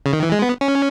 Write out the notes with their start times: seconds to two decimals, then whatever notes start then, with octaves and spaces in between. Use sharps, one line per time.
0.06 C#3
0.13 D#3
0.23 E3
0.32 G#3
0.42 B3
0.61 C#4